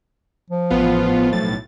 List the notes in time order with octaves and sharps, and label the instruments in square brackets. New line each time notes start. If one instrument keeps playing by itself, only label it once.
[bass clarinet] F3
[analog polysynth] A1 B3 F4
B1 A2 A6